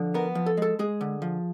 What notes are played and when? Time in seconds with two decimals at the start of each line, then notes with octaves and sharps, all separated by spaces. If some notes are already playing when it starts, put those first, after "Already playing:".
Already playing: D3 F3
0.14 B3 A#4
0.35 F3
0.46 A4
0.57 G#3 A4
0.79 G#3 G#4
1.01 D3
1.22 F3